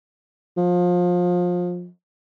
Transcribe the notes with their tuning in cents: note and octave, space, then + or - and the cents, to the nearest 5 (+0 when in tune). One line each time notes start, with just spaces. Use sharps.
F3 +25